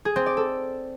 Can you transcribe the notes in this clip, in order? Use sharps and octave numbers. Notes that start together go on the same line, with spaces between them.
G#4
C4
D5
A4